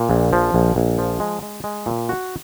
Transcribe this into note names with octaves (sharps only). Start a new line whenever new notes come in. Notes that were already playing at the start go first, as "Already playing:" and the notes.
Already playing: A#2
A#1
F3
A#1
A#1
F3
G#3
G#3
G#3
A#2
F#4